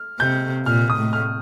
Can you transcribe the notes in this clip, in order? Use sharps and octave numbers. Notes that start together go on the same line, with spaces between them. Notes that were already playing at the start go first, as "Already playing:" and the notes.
Already playing: F6
C3 G6
A#2 F6
D#6
A2
F6